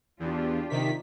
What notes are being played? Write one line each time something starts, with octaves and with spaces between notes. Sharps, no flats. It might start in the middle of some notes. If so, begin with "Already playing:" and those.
E2 D4 F4 G4
C3 D#3 B6